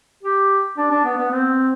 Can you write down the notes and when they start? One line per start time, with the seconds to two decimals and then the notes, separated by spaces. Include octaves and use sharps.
0.23 G4
0.77 D4
0.91 D4
1.05 B3
1.17 B3
1.31 C4